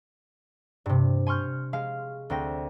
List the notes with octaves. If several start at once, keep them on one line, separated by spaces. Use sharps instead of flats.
G2 C3
G#5 C6 C#6 F6 G6
G#3 F5
D2 C4 G5 A#6